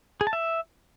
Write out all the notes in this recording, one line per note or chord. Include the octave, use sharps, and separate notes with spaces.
G#4
A5
E5